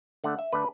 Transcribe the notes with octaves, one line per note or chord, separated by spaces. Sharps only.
D3 A3 D4 F#5
E5
D3 A3 D4 B4